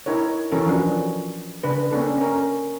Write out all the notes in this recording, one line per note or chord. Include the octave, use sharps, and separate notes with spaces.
D#4 E4 A#4 C#5
E3 C#4 A4 A#4
F3 F#3 D4
C#3 D4 B4
A#3 C#4 D4 A4
C#4 A#4